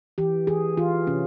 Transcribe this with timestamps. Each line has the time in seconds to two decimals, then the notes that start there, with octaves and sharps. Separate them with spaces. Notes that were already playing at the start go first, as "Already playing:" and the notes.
0.18 E3 G4
0.47 E3 G#4
0.77 E3 F4
1.07 C3 C#4